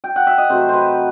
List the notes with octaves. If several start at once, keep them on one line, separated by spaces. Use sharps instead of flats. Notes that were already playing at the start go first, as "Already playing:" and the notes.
G5
F#5
E5
D#5
C3 F#3 A3 C5
C5
B4